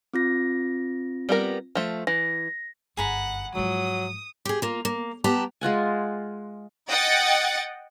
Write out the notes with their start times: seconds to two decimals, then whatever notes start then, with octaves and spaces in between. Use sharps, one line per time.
0.13 C4 F4 A#6
1.29 G3 B3 A#4
1.75 F3 A3
2.07 E3 A#6
2.97 G1 F#2 G#4 F#5 A#5 B5
3.55 G#2 F3 F#3 D#6
4.45 G4 G#4
4.62 A#3 F4
4.85 A#3
5.24 B3 G4 G5 A5 A#5
5.61 G#3 F4 F#5 G#5
6.89 D#5 F#5 G5 A6 C#7